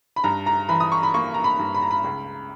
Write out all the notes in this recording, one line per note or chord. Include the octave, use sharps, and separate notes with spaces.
B5
G2 A#5
A#5
E3 B5
D#6
C#6
B5
A#3 C#6
A#5
B5
G2
B5
A#5
B5
C#2